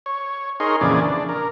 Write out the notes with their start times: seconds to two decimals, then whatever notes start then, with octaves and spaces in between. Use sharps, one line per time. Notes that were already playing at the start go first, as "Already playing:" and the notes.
0.06 C#5
0.60 D#4 G#4 A#4 C#5 C6
0.81 F2 A#2 C#3 E3 G#4 D5
1.01 D4
1.29 A#4